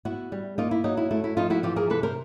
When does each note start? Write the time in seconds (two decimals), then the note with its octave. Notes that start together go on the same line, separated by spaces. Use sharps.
0.05 B3 E4 F#4
0.32 G3
0.58 A#3 D#4 F4
0.71 E4
0.84 F#3 D#4
0.97 E4
1.11 A3 E4
1.24 E4
1.37 F3 D#4 F4
1.50 E4 F#4
1.63 E3 F4 G4
1.76 G#4 A#4
1.90 C3 A4 B4
2.03 A#4 C5